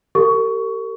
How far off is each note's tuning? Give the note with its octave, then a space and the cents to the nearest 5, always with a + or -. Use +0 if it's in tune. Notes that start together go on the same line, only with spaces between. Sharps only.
G4 +0 A#4 -40 C#6 +20